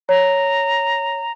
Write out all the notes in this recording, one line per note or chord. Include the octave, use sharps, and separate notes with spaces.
C#5 A#5